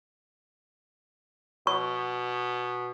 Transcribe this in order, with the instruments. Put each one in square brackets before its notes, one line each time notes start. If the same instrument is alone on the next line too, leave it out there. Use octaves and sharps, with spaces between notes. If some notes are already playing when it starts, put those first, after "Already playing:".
[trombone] B2 [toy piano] C#6